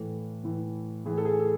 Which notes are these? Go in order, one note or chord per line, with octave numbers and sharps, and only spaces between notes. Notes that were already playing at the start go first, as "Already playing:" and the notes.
Already playing: A2 E3 A4
A2 E3
A2 E3 G#4
A4
G#4
A4